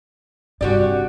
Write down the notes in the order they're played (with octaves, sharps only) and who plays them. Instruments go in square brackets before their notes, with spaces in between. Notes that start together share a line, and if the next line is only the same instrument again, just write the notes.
[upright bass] G2 C3 [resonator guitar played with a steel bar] F#4 G4 D5